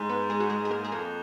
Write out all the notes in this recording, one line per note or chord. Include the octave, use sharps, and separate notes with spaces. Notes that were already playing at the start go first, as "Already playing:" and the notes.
Already playing: G#2 G#3 G#4
B3 B4
G#3 G#4
F#4
G#3 G#4
G#4
A#3 A#4
G#4
F2 A#3 A#4